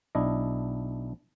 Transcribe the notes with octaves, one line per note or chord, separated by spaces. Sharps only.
B1 D4 E4 D#5